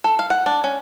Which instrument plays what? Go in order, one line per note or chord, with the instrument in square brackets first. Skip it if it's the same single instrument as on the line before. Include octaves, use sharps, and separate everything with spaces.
[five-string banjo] A4
F5
F#5
D4
C#4